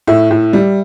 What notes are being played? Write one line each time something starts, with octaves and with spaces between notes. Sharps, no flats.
A2 E5
A2
G3